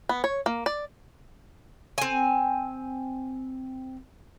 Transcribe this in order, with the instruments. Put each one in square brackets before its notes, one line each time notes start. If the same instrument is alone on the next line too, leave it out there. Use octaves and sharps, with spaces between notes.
[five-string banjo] B3
C#5
A#3
D5
[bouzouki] C4 G#5